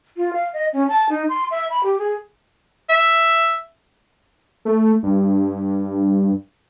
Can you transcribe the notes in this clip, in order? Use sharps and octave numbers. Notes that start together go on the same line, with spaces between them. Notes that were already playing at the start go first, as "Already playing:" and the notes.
F4
F5
D#5
C#4
A5
D#4
C6
E5
B5
G4
G#4
E5
A3
G2